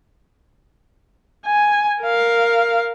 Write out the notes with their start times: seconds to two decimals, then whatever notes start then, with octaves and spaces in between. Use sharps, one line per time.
1.46 G#5
2.02 A#4 F5